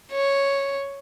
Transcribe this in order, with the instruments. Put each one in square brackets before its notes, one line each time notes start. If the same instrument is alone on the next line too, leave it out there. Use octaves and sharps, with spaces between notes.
[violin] C#5